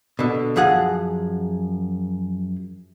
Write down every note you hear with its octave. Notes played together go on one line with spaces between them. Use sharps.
B2 D3
F#2 F3 G#4 F#5